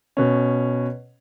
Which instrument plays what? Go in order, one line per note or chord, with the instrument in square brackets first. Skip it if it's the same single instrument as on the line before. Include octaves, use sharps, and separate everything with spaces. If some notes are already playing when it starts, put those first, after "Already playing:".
[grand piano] B2 C#4